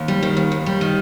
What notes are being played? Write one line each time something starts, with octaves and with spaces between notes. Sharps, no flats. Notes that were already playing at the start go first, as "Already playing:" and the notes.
Already playing: D#2
G3
D#3
D#2
D#2
G3
D#3